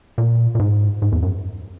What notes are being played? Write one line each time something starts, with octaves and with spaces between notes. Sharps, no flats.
A#2
A#2
G#2
G#2
E2
F#2